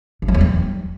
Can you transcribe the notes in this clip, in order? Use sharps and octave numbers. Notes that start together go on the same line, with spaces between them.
C#3
F#3
E2
G3